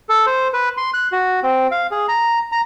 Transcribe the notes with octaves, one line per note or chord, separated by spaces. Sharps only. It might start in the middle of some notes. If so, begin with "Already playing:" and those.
A4
C5
B4
C6
F#6
F#4
C4
F5
G#4
A#5
A#5